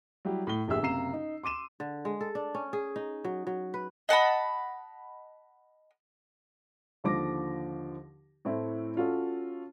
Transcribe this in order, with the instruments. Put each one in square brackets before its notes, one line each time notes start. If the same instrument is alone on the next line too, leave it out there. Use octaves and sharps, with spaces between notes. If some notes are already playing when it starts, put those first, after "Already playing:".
[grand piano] F#3 G3 E4 G4
A2 G7
F1 A#1 G4 G#4 E5 E6
F#1 C3 F5 A#5 C7 E7
D#4
C6 D6 D#7 E7
[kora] D3
G#3
A4
D4
C#4
G#4
D#4
F#3
F#3
B4
[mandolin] D#5 F#5 A5 B5
[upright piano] D#2 D3 F3 D6 A#6
A2 A3 C4 E4
C#4 F4 F#4 A4